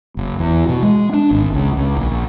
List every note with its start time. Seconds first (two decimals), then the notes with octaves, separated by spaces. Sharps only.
0.17 F#1
0.39 E2
0.69 B2
0.83 G#3
1.14 D4
1.31 G#1
1.54 C#2
1.77 C#2
1.97 A#1